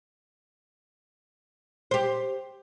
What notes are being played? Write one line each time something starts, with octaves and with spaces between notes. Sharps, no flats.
G4 C5